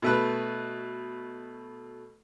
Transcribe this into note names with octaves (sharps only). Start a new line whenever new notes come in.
B2 A3 B4